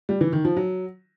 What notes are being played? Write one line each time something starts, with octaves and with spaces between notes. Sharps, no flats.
G3
E3
D#3
F3
F#3